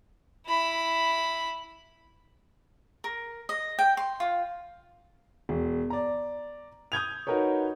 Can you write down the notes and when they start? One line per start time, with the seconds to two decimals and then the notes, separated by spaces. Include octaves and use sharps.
0.46 E4 B5
3.04 A#4
3.49 D#5
3.79 G5
3.97 C6
4.20 F4
5.49 E1
5.90 D5 A#5
6.92 D#6 G6 G#6 F7
7.27 D#4 F#4 A#4 B4 C#5